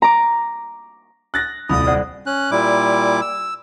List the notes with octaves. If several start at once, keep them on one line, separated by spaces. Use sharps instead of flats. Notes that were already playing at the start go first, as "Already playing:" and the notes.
A#5 D6
D#6 F#6 A6 A#6
D#1 C2 B5 D#6
C5 D5 F#5
C#4 F#6
A#2 G3 E4 D6
E6